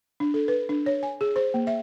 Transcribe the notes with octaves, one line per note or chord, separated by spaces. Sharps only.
D4
A4
B4
D4
C#5
G#5
G#4
C5
A#3
E5